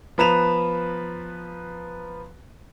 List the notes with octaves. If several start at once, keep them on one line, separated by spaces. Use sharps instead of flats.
F3 B3 B4 A#5 E7 F7